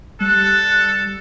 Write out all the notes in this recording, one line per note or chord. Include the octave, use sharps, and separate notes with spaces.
G3 A4 F#6